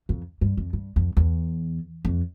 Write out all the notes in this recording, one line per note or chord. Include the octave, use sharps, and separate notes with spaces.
F2
G2
F2
G2
F2
E2
F2